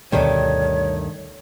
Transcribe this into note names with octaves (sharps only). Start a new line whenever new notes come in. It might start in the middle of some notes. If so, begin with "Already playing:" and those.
D2 G2 B2 D#3 A3 C#5